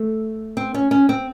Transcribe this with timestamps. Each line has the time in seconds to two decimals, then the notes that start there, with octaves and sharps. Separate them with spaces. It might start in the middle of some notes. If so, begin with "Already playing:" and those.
Already playing: A3
0.57 C4
0.74 C#4
0.91 C#4
1.09 C4